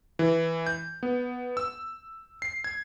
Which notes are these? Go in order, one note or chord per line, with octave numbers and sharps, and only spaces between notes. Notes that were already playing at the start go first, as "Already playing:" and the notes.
E3
G6
B3
E6
C7
G#6